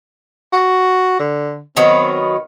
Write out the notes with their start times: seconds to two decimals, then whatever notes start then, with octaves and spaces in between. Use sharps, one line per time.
0.52 F#4
1.20 D3
1.77 D#3 F#3 B3 C4